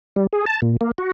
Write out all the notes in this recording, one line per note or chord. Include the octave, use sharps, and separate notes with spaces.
G3
G#4
A5
A#2
A#3
F#4